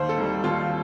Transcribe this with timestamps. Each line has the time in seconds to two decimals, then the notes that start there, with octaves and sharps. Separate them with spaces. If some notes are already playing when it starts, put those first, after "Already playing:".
Already playing: D#2 C5
0.09 A4
0.18 D#3 G3
0.44 D#2 F4